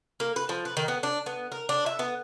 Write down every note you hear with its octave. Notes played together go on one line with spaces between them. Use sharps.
A#3
B4
F3
B4
D#3
B3
D4
B3
A#4
D4
E5
B3